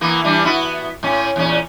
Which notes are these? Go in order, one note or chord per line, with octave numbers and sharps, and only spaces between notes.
E3 A#3 B3
E3 G3 D4
B3 E4 F#4
A2 C#4
E2 A#2 C#4